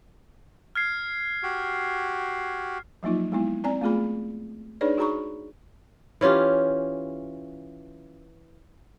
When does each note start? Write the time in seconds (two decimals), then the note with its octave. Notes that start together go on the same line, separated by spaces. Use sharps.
0.75 F6 G#6 C7
1.43 F#4 G4
3.03 F3 F#3 A#3 D#4 F4
3.32 G#3 B3 E4
3.64 C4 C#4 D5 G#5 A#5
3.81 A3 B3 F4 G#4 B5
4.81 D4 D#4 G#4 B4 C#5 D5
4.97 D#4 F#4 G#4 A#5 B5 C#6
6.21 E3 C#4 F4 G4